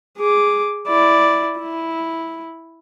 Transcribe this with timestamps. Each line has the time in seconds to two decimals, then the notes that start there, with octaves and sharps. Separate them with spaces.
0.19 G#4 D6
0.88 E4 D5
1.60 E4